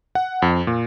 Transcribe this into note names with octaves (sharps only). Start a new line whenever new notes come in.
F#5
F2
A#2